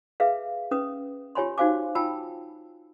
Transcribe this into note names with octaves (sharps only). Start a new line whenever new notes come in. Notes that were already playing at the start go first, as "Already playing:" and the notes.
G#4 B4 E5 F5
C#4 B4 D#6
F4 G4 C#5 G#5 B5 C6
D#4 F#4 C5 F5 G#5 D6
F4 G5 A5 B5 E6